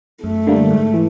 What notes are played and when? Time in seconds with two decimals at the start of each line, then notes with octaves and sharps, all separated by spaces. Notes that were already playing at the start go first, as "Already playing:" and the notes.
0.23 F#2 A3
0.47 D3 G3 A#3
0.70 G#2
0.94 E3